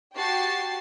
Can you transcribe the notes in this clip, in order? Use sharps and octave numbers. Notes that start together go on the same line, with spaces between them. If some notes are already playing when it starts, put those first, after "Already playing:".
F#4 G4 G5 A5 A6 C7